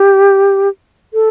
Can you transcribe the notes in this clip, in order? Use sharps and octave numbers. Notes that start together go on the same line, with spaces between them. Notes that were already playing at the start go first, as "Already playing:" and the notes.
Already playing: G4
A4